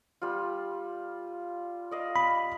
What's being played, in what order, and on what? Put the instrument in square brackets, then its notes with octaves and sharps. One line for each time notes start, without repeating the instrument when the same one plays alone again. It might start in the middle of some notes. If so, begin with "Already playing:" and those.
[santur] G3 F4
D5 D#5 F5
[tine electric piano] B5